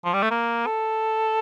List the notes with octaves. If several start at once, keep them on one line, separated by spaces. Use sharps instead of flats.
F3
G3
A3
A#3
A4